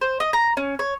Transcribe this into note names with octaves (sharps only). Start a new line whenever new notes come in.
C5
D#5
A#5
C#4
C#5